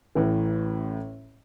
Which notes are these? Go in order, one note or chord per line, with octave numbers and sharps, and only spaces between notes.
A1 A2 E3